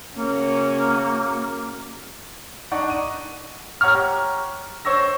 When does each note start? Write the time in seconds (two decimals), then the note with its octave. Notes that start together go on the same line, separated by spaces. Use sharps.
0.15 C#3 A#3 C#4 F#4
2.71 D4 D#4 F#5 C#6
2.90 D#7
3.81 G4 C#5 F#5 A#5 C#6 F6
4.85 C5 C#5 C#6 E6 A#6